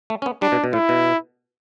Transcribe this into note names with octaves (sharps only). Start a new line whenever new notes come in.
A3
C#4
B3
G3 D4
B2
B2
A2 E4
B2